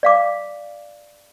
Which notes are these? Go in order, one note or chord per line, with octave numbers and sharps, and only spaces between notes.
D5 F5 D6